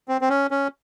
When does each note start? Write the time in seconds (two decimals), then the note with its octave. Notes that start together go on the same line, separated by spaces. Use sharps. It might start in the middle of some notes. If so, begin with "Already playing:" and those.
0.08 C4
0.21 C4
0.29 C#4
0.51 C#4